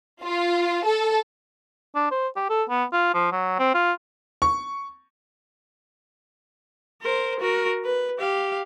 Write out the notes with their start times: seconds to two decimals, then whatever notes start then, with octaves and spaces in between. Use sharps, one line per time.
0.24 F4
0.86 A4
1.95 D4
2.11 C5
2.36 G4
2.50 A4
2.69 B3
2.92 F4
3.14 F3
3.32 F#3
3.59 C4
3.74 F4
4.42 C#6
7.02 A#4 C5
7.40 F#4 A#4
7.85 B4
8.20 G4 F5